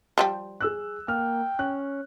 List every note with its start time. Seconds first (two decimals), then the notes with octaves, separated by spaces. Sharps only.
0.18 F3 G3 G4
0.60 G#4 E6 F#6
1.08 A#3 G5 F6
1.59 C#4 F#6